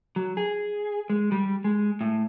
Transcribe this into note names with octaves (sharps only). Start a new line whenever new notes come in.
F#3
G#4
G#3
G3
G#3
A2